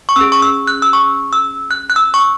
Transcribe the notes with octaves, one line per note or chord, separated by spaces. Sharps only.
C#6
C#4 G#4 E6
C#6
E6
F#6
E6
C#6
E6
F#6
F#6
E6
C#6